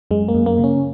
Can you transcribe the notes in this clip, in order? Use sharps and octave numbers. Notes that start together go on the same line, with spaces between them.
F#2 G#3
A#3
F#2
A#3
C#3
C#4